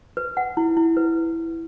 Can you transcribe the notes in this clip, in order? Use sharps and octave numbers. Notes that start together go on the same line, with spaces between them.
B4
F#5
E4
E4
B4